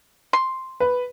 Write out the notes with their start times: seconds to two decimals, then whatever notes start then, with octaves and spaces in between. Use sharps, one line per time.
0.33 C6
0.80 B4